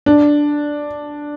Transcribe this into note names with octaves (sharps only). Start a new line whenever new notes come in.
D4